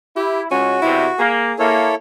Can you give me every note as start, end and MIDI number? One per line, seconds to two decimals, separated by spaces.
0.16 0.47 64
0.16 0.41 67
0.51 0.77 37
0.51 0.80 61
0.51 1.21 66
0.82 1.06 35
0.82 1.06 40
0.82 1.06 48
0.82 1.11 64
1.19 1.54 58
1.19 1.75 68
1.59 1.93 58
1.59 1.95 64
1.59 1.95 69
1.59 1.95 73